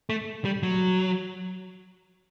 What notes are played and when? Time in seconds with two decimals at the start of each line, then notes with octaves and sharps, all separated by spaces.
0.10 A3
0.45 G3
0.63 F#3